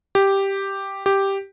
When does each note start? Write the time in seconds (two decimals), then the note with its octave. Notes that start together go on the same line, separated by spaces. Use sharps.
0.15 G4
1.06 G4